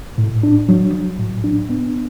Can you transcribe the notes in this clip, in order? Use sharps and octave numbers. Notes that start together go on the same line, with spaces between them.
A2
D4
F#3
F#3
A2
D4
B3